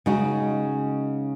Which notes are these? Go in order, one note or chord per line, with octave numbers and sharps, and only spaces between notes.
C#3 G#3 D#4 F#4